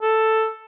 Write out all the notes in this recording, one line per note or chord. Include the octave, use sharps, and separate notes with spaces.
A4